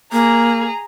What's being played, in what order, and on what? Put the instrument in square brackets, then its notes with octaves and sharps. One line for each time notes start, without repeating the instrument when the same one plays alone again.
[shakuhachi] A#3 [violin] G#4 A#5